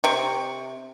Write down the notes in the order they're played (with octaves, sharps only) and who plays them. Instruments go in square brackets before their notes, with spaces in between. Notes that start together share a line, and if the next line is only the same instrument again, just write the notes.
[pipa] C3 C#6